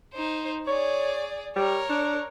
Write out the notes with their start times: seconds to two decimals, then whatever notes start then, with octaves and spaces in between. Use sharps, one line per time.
0.14 D#4 C5
0.67 G#4 C#5 D5
1.56 G3 A#4 C#5
1.90 D4